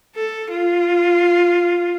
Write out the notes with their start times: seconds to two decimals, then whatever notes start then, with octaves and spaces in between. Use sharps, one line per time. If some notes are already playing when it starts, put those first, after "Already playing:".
0.16 A4
0.51 F4